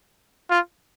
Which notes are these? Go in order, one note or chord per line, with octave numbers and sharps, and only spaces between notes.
F4